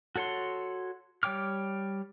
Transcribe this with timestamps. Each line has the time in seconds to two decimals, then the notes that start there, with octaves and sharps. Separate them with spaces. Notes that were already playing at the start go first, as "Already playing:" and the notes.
0.16 F#4 A4 C#5 F#5 C6
1.23 G3 C#5 G5 D6 F6